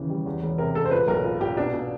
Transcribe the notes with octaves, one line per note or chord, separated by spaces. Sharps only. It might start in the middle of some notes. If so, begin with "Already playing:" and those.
Already playing: D#2 C#3 E3
G3
E2
E1
C3 A#4
E1 A4
C5
A#2 B4
B1 A#4
A#2
A#2 G4
B2 D4
B2